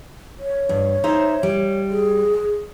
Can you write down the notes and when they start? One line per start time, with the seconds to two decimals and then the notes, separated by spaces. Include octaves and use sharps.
0.39 C#5
0.69 G2
1.04 D#4 C5 E5
1.43 G3
1.90 G#4